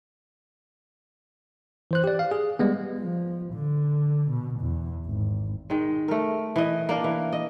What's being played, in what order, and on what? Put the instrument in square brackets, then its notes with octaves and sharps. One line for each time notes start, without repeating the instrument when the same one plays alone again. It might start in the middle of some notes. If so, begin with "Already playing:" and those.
[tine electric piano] E3 C5 F#6
G4 D5
F5
G#4
G3 G#3 B3
[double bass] F3
D3
B2
E2
G#1
[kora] D#3 G#3
A3 A#4
E3 D#5
A#3 D4 A#4
E3
D#5